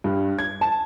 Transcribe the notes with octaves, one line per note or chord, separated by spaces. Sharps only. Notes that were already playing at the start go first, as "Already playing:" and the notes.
G2
G#6
A5